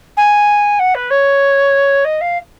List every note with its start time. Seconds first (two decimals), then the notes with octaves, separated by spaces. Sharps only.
0.17 G#5
0.79 F#5
0.94 B4
1.10 C#5
2.04 D#5
2.21 F5